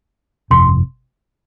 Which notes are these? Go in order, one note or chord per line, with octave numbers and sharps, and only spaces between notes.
G1 F2 C3 C6